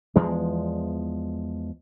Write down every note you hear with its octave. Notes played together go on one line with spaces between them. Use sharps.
E2 F3 G#3